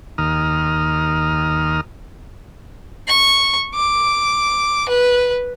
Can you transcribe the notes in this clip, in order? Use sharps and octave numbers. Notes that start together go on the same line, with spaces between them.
D#2 A#5 D#6 F6
C#6
D6
B4